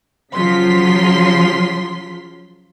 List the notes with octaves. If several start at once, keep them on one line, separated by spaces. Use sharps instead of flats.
C#3 F3 F#3 F4 C6 B6